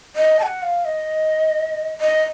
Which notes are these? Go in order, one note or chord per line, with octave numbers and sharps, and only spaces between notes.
D#5
A5
F#5
F5
D#5
D#5